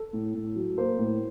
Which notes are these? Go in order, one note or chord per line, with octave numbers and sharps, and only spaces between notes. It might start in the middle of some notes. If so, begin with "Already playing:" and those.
Already playing: A4
A2
A2
F#3
A#3 C5
A2